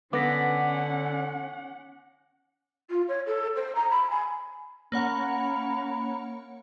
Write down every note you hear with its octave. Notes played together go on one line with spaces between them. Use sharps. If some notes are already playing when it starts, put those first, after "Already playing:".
D3 B3 C#4 F#5 D6 A#6 B6
F4
C#5
A4
C5
A#5
B5
G#5
A#3 C#4 C#5 F#5 A#5 B5